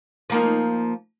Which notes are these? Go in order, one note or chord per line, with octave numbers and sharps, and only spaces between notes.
F3 A#3 D#4